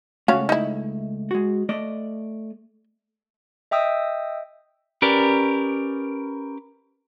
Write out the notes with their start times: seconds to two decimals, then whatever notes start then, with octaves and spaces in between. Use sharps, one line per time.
0.28 C#2 A3 C#4 F#4 F5
0.49 D#4 E4
1.31 G#3 F#4
1.69 A3 D5 D#5
3.71 D#5 E5 G5 D#6 E6
5.02 C#4 G4 A#4 B4 D5